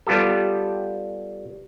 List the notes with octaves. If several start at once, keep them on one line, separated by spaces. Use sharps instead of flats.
G3 B3 F4 G4 A4